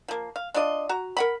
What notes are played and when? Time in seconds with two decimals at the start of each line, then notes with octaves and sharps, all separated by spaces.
0.08 F3 A#3
0.36 F5
0.54 D4 F4 D5 D#5
0.89 F#4 A#5
1.17 A#4 F#5 B5